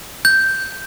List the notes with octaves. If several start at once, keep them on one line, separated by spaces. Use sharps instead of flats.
G6